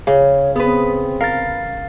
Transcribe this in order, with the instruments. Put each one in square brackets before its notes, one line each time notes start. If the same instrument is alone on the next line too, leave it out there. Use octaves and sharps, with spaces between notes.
[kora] C#3 [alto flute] C#5
[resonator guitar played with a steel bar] B3 B4 [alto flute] C4 [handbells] G#4
[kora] A#4 [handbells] F5 A6